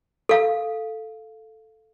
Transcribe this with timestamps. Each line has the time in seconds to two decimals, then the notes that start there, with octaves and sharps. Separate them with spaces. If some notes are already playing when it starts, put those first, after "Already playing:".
0.29 A4 F5